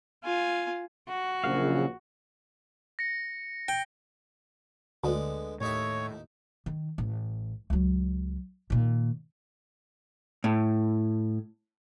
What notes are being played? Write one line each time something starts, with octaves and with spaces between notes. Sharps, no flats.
F4 G#5
F#4
A#1 C#3 F#3 F5
A#6 C#7
G5
D2 D3 G#3 B3
D#2 A2 A3 D#4 C#5 E5
D#3
A1
C#2 F#3
A#2 D#3
A2